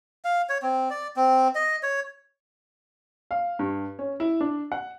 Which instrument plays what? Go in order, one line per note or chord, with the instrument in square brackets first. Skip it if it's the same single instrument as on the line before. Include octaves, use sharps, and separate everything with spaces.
[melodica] F5
C#5
C4
D5
C4
D#5
C#5
[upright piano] F5
G2
C#4
E4
D4
F#5